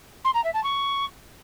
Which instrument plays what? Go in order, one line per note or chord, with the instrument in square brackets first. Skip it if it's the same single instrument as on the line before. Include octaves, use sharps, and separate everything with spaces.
[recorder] C6
A#5
E5
A5
C#6